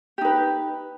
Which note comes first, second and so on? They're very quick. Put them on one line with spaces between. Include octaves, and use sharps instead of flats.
G4 D#4 B4